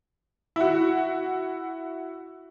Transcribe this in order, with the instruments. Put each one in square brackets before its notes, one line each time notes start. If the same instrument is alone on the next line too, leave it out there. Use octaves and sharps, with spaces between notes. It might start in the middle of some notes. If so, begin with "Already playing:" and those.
[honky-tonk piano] E4 F#4